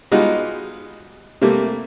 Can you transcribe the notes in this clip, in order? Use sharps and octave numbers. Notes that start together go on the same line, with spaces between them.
G3 G#3 B3 D#4 F4 F#4
C3 G3 A3 A#3